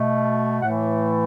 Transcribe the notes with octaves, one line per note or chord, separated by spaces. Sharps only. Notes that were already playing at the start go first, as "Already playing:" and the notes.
Already playing: B2 A3
A2 E3 A3 F#5